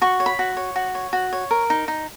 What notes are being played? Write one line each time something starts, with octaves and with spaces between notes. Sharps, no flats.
F#4 C#6
C#5
B5
F#4
C#5
F#4
C#5
F#4
C#5
A#4
D#4
D#4